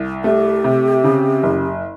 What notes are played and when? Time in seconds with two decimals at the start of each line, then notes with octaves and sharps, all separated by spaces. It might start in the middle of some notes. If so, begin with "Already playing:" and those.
Already playing: C2
0.24 A3 G4
0.64 C3
1.04 C#3
1.43 F#1